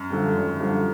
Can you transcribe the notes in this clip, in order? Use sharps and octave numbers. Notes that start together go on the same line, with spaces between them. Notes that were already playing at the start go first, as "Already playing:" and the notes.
Already playing: F#2
G2 D3 F3
G#1
G2 D3 F3